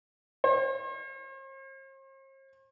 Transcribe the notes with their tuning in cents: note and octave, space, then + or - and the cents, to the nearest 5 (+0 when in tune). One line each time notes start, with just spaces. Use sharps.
C5 +45